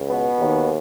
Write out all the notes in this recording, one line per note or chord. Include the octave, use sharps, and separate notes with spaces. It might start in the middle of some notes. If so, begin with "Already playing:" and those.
Already playing: C#2
B2 B3
D#2 D#3